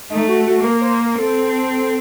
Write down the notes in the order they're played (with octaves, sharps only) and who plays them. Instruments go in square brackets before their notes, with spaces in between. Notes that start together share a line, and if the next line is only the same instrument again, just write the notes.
[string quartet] A3 [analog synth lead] D#4
[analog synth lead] F#4
F#4
[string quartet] A#3 [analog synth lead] A#4
[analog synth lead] C5
A#4
[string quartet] C4 [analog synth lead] A4